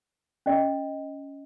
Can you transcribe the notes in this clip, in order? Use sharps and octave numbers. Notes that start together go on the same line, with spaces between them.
C#4 D#5